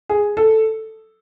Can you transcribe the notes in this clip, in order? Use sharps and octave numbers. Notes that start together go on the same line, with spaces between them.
G#4
A4